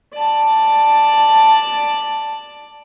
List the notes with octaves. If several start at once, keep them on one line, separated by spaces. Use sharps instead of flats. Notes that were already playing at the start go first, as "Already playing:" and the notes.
D5 A5